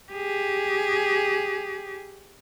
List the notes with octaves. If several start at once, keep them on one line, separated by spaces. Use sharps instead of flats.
G4 G#4